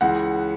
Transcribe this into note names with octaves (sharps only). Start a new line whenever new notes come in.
C#2 C#3 E3 F#5